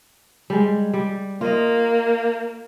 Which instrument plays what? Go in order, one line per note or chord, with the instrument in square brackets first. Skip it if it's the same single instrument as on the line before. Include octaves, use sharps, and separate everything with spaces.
[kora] G3 G#3
G3
[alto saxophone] A#3 [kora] F4 D#5